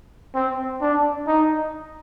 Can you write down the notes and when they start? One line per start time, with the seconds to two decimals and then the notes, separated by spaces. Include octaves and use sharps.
0.35 C4
0.81 D4
1.27 D#4